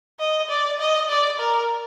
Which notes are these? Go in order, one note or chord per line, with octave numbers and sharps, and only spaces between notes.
D#5
D5
D#5
D5
A#4